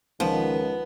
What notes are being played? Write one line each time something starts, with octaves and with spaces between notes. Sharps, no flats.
C#2 D#3 F3 B3